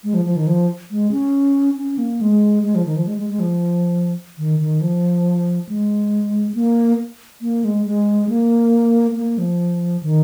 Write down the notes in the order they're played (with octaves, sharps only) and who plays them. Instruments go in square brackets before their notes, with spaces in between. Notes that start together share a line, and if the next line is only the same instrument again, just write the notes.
[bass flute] G#3
F3
F3
D#3
F3
G#3
C#4
C#4
A#3
G#3
G#3
F3
D#3
F3
G#3
G#3
G#3
F3
D#3
D#3
F3
G#3
A#3
A#3
G#3
G#3
A#3
A#3
F3
D#3